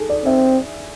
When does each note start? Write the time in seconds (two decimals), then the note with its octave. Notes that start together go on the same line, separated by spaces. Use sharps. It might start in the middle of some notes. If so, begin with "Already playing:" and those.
Already playing: G#4 A4
0.09 D5
0.25 C4 E5